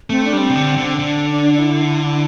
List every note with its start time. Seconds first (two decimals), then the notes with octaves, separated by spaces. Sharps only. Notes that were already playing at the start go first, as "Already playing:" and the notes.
0.10 A3 C4
0.25 D4
0.33 G3
0.38 C4
0.49 C3
0.56 D3
0.77 D3
0.99 D3 D4
1.30 D4
1.54 D4
1.59 E4
1.89 E4